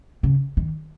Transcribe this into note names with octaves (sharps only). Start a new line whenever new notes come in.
C#3
D#3